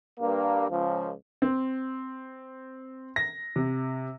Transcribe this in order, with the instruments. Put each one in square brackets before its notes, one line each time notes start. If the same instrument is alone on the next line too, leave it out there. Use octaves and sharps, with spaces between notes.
[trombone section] G2 A#3
C#2 F3
[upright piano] C4
A#6
C3